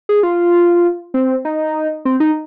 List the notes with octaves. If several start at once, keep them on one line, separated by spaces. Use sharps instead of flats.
G#4
F4
C4
D#4
C4
D#4